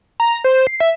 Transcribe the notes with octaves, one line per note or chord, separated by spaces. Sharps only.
A#5
C5
C7
E5